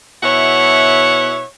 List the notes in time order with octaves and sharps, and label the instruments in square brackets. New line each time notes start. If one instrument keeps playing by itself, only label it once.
[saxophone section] B2 E4 C#5 E5 F#5